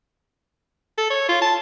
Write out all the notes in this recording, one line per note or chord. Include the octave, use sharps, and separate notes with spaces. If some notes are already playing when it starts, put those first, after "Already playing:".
A4
C#5
F4
A5